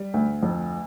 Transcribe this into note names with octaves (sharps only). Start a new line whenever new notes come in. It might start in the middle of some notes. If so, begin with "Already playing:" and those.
Already playing: G3
D2
F2